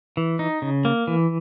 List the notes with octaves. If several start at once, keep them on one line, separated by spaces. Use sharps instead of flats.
E3
D#4
C#3
A#3
E3